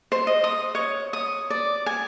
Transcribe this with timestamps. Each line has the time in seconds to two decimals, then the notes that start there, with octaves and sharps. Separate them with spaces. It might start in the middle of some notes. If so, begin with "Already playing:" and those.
0.12 C5
0.27 D#5
0.44 D#6
0.75 C#5
1.13 D#6
1.50 D5
1.86 G#5